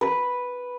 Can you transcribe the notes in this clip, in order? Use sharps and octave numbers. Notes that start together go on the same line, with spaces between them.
B4